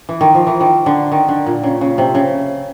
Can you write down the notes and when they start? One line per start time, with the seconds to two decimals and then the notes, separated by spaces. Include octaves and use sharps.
0.09 E3
0.21 D#3
0.35 F3
0.47 E3
0.61 D#3
0.86 D3
1.12 D#3
1.28 D3
1.46 A#2
1.63 C#3
1.81 C#3
1.98 C3
2.15 C#3